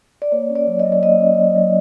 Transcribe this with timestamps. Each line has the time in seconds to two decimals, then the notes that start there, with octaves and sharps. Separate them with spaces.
0.22 D5
0.32 A#3 C#5
0.50 C#4
0.55 D5
0.67 F#3
0.79 D#5
0.85 F#3
0.92 D5
1.02 A#3 D#5
1.21 C#4
1.38 F#3
1.56 F#3